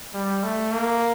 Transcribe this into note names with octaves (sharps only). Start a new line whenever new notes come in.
G3
A3
A#3